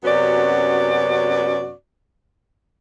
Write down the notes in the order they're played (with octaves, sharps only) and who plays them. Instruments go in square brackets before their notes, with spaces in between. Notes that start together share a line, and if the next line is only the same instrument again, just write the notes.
[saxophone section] F#2 C3 B3 C#4 F#4 D5